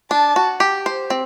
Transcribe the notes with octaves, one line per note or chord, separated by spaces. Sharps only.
D4 A5
F#4
G4
C5
C4